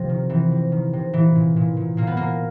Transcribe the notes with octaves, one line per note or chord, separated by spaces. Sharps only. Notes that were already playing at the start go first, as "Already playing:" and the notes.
Already playing: C3 F3
D#3
C3 E3
C3
D#3
C3
A#2 E3
A#2
A#2
A#2
A#2 A#3
B3
A#2 A#3